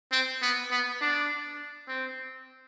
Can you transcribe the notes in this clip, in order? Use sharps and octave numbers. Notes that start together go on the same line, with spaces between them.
C4
B3
B3
D4
C4